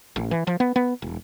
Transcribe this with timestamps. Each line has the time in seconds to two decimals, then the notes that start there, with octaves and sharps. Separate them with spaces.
0.16 A1
0.31 E3
0.47 F3
0.60 B3
0.76 B3
1.02 E1